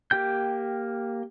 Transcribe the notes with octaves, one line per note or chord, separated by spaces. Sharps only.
A#3 G4 G5 G6